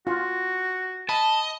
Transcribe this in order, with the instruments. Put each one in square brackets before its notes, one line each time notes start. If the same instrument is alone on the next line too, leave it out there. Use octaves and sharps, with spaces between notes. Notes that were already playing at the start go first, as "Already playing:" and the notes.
[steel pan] F4 [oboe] F#4
[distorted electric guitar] D#5 [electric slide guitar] A5 [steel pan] B5